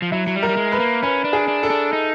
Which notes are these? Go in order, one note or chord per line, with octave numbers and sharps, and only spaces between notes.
F3
F#3 E4
F#3
G3
A#4
G3
G#3
B4
A#3
C#4 B4
D4
G#4
D4
A4
D4
D#4